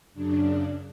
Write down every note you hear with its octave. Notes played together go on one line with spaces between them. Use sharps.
F#2 C#3 D4